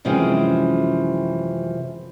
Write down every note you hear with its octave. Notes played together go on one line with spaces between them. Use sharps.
F#2 C3 E3 F3 G#3 C#4